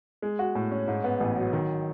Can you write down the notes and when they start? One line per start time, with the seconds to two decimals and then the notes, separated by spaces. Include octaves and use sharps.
0.22 G#3
0.39 F#4
0.55 A2
0.72 C#4
0.87 G#2
1.04 B3
1.20 A1
1.36 F#3
1.53 D#3